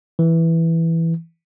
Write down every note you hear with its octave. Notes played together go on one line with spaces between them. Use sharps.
E3